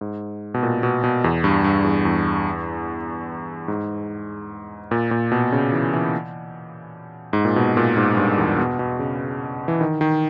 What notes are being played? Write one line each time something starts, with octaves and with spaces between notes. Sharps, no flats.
G#2
B2
A#2
B2
B2
E2
G2
G2
E2
E2
G#2
A#2
A#2
B2
C#3
E3
E3
G#2
A#2
B2
A#2
G#2
G2
E2
B2
B2
C#3
E3
D#3
D#3